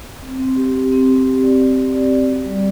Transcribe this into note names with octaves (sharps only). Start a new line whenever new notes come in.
C4
C4
G4
G4
C4
G4
G4
D5
D5
C4
D5
D5
F#4
G3